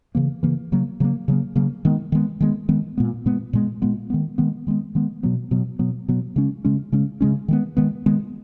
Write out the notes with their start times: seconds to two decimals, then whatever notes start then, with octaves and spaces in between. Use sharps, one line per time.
0.15 C#3 E3 A#3
0.43 C#3 E3 A#3
0.72 C#3 F#3 A#3
1.00 C#3 F#3 A#3
1.28 C#3 F#3 A#3
1.55 C#3 F#3 A#3
1.85 D#3 G#3 B3
2.12 D#3 G#3 B3
2.41 D#3 G#3 B3
2.69 D#3 G#3 B3
2.98 A#2 G#3 B3
3.26 A#2 G#3 B3
3.53 A#2 G#3 B3
3.82 A#2 G#3 B3
4.10 D#3 G#3 B3
4.38 D#3 G#3 B3
4.67 D#3 G#3 B3
4.95 D#3 G#3 B3
5.23 B2 F#3 B3
5.51 B2 F#3 B3
5.79 B2 F#3 B3
6.08 B2 F#3 B3
6.36 C#3 G#3 C#4
6.65 C#3 G#3 C#4
6.92 C#3 G#3 C#4
7.21 C#3 G#3 C#4
7.48 D#3 G#3 B3
7.77 D#3 G#3 B3
8.06 D#3 G#3 B3